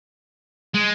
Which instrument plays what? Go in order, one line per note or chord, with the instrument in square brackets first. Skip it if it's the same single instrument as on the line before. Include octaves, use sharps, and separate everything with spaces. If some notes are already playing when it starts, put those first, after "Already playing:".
[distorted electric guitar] G#3